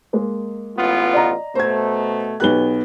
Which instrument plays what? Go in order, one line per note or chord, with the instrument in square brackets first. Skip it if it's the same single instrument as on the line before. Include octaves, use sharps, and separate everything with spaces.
[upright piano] G#3 A#3 G#4
[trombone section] A1 B3 F4
[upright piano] D5 D#5 A#5
[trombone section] B2 A3 [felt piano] C5 G#6
[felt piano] B1 B3 F#6 [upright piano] G4 G7